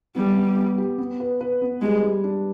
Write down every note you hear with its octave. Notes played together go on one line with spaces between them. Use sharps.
G3 B3
B3
B3
G4
B3
B4
B4
B3
G3 G#3
G3
D4